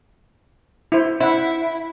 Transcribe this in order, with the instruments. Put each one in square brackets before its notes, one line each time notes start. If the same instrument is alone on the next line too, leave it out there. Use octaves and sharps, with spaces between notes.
[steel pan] E4 C5
[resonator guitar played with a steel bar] E4 [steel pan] C5 E5 F#5